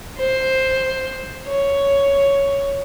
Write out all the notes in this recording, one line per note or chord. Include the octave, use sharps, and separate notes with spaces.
C5
C#5